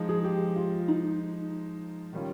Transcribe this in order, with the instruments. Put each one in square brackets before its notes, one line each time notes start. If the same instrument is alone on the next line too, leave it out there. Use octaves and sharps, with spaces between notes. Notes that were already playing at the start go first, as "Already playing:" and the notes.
Already playing: [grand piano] F3 G#3 D#4
[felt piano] G#4
G4
F4
D#4
[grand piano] D#3 G3 C#4 F4